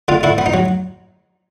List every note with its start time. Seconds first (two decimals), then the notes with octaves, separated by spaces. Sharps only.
0.08 D3 F4
0.23 D3 E4
0.38 B3
0.46 D#4
0.54 F#3